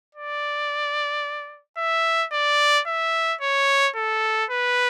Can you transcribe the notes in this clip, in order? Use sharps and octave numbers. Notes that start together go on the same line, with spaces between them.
D5
E5
D5
E5
C#5
A4
B4